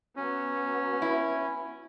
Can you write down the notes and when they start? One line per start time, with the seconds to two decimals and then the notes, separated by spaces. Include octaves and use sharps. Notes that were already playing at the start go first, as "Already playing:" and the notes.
0.16 F#3 B3 C#4
1.02 E4